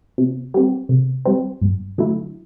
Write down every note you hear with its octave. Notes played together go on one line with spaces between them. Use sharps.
C3
G3 C4
C3
G3 C4
G2
D3 F#3 A3 E4